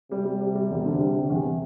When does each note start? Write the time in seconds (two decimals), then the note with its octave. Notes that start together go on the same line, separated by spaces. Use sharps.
0.11 C3 G3
0.25 G3
0.41 G3
0.55 G3
0.71 E1
0.86 D3
1.00 G3
1.15 D3
1.29 E2 C3